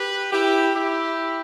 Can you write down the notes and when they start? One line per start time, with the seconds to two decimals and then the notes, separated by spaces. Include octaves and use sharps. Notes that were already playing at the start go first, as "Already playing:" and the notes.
Already playing: G4 B4
0.32 E4 G4
0.74 E4 G4